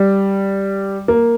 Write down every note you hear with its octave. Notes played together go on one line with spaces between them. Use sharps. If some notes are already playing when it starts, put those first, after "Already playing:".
Already playing: G3
A#3